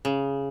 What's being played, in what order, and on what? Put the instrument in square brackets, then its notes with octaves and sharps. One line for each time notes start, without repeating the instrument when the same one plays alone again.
[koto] C#3